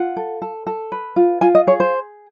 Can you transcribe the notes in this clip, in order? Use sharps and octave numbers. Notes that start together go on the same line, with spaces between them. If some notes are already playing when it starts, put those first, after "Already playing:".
Already playing: F4 F#5
A4
A4
A4
B4
F4
F4 G#5
D#5
G#4 C#5
C5